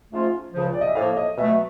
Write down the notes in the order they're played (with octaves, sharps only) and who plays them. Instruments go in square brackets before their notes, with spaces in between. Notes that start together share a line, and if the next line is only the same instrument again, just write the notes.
[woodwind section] G#2 F3 A3 C#4 F4
C#2 C#3 F3
[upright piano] D5
D#5
E5
[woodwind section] A2 F3 A#3 [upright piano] F5
[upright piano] D#5
[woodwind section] B2 F#3 A3 [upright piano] E5